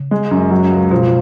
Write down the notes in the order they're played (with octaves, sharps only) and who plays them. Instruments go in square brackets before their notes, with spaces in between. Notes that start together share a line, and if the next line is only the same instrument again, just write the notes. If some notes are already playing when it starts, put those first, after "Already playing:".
Already playing: [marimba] C#3
[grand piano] G#3
F#2
F#3
C#2
[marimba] B2 [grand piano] F3